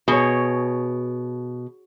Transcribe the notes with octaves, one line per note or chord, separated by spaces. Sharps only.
B2 G#4 C#5